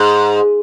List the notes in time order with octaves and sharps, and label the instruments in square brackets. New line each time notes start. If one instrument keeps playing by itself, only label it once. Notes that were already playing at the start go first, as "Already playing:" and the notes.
Already playing: [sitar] G#2